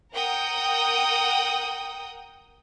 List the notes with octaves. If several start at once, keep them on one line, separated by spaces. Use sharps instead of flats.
A#4 F#5 G5 D#6